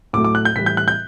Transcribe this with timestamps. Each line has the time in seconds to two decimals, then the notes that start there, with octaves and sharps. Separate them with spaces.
0.13 A2 F#3 A3 D6
0.24 D6
0.35 F#6
0.45 G6
0.56 A2 E3 G3 B6
0.66 G6
0.77 F#6
0.88 G6